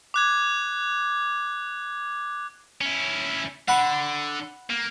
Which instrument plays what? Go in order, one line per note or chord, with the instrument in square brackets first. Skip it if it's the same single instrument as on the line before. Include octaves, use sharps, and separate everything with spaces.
[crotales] D6 F#6 G#6
[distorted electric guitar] C#4 E4
[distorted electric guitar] D3 [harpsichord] F#5 B5
[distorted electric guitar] A#3